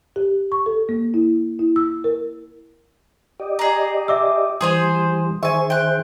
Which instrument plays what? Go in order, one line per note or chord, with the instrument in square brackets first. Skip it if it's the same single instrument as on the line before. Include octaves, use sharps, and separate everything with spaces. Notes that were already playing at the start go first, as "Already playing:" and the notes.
[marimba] G4
C#6
A4
A#3
E4
E4
E6
A#4
[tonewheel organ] G4 D5 D#5
[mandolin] G#4 A#5
[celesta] E5 D6 E6
[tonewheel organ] E3 G3 [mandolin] G#4 C5 G#5 [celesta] C6 D#6
[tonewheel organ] D#3 G#4 C5 [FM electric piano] E5 [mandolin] G#5 C#6
[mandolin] G5 F#6